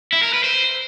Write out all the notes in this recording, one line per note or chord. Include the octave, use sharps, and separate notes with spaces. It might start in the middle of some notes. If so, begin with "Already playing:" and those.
E4
A#4
B4
C5